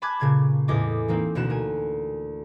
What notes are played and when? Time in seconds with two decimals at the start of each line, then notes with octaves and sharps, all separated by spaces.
0.02 G#5 A5 B5 D6 F#6 G#6
0.20 A#2 C#3 G#6
0.68 E2 A2 D#5 G#5 D6
1.08 E3 A#3 C4 D#4
1.35 D2 B2 F#6 E7
1.50 A#4 G#5